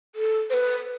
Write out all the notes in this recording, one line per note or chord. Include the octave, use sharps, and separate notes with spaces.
A4
C5
B4